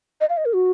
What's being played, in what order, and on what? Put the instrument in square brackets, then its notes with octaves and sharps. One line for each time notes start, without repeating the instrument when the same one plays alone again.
[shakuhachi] D#5
F5
D#5
A#4
F#4